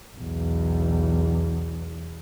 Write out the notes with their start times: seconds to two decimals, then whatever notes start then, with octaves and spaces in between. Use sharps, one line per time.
0.16 B1 E2